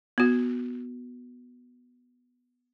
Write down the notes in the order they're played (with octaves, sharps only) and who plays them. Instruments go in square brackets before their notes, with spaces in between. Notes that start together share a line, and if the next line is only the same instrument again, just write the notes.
[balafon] B3 F#4